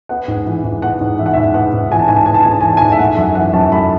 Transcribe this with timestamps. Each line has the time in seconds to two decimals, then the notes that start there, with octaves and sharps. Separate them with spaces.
0.09 B3 F#5
0.28 G#2
0.46 E3
0.64 G#2
0.82 B3 F#5
1.01 G#2
1.19 E3 E5
1.26 F#5
1.33 E5
1.37 G#2
1.54 B3 F#5
1.73 G#2
1.91 E3 G#5
2.00 A5
2.08 G#2 G#5
2.16 A5
2.26 B3 G#5
2.34 A5
2.43 G#2 G#5
2.52 A5
2.61 E3 G#5
2.68 A5
2.77 G#5
2.81 G#2
2.92 E5
2.99 A3 F#5
3.17 F#2 E5
3.35 E3 F#5
3.53 F#2 A5
3.72 A3 B5